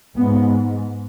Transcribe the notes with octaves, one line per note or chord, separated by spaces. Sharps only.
G#2 B3